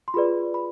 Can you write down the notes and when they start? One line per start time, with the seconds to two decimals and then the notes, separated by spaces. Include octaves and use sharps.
0.08 C6
0.14 F4 G#4 B4 D5 B5
0.54 B5